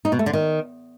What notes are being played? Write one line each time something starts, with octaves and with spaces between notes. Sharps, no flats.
D#4
B2
A3
D3
D#3